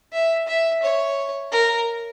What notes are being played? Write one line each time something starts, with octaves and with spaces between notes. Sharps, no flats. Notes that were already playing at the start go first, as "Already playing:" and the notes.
E5
E5
C#5
A#4